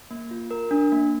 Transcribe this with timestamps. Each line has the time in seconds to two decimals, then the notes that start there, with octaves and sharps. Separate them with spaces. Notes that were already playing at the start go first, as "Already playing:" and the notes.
0.11 A#3
0.31 F4
0.51 A#4
0.71 D4
0.92 A#3